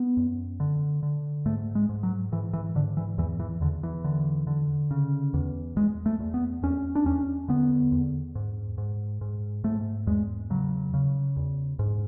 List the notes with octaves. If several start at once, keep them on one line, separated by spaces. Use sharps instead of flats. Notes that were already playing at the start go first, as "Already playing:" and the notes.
Already playing: B3
F#2
D3
D3
G#2 A3
G#3
G#2
F#3
G#2 E3
E3
G#2 D3
E3
E2 E3
E3
E2 D3
E3
D3
D3
C#3
E2
E2 G#3
A3
E2
B3
E2 C#4
D4
E2 C#4
D3 B3
E2
G#2
G#2
G#2
G#2 A3
E2 G#3
C#3 F#3
C#3
E2
G#2